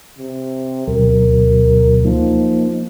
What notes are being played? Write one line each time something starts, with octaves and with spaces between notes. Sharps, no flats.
C3
D2 B2 F#3 A#4
F3 A#3 D#4